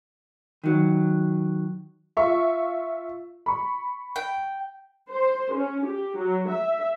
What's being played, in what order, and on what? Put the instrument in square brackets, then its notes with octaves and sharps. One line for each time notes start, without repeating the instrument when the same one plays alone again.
[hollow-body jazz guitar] D#3 F#3
[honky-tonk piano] F4 E5 C#6
B5 C#6
[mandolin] G5
[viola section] C5
C#4
G4
F#3
E5